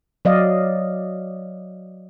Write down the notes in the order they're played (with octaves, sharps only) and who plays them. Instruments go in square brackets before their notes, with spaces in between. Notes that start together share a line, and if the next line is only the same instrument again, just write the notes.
[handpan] F#3 D5 D#5 F5